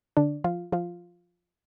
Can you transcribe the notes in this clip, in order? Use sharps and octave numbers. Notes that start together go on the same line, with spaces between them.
D3 D4
F3 F4
F3 F4